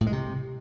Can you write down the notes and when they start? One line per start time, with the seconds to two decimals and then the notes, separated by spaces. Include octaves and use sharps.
0.01 A2
0.07 G#3
0.12 C3